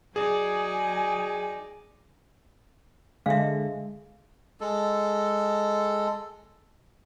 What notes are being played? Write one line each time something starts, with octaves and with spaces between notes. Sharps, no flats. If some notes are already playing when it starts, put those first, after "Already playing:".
F#3 D#4 G#4 D5 G#5
D3 G#3 A4 E5 F5
G#3 A4